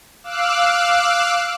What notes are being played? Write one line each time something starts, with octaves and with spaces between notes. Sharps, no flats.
F5 D6 E6 F#6